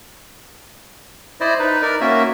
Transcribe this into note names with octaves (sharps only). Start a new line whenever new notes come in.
E4 C5 D5 D#5
D#4 B4
A#4 D5
A#3 C#4 F#4 E5